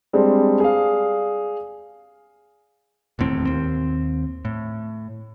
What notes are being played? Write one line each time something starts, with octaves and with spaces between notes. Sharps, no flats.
G3 G#3 C4 D4 G#4
G#4 D5 F5
E1 D#2 A2 C4
D#2 C4
A2